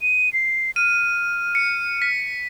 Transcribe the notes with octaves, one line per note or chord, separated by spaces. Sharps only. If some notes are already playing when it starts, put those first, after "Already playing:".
D#7
C7
F6 D#7
C#7
B6